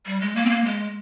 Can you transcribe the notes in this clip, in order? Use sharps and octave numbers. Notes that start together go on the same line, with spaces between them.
G3
G#3
A#3
C4
A#3
G#3